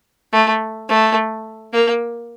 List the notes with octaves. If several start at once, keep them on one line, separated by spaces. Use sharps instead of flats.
A3
A3
A#3